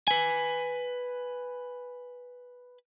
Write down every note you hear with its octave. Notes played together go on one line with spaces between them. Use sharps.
B4 G#5